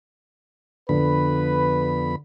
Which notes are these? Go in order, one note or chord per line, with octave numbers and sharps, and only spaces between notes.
F2 D3 B3 B4 B5